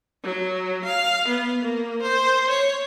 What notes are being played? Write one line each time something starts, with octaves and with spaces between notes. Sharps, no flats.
F#3
F5
B3
A#3
C5
C#5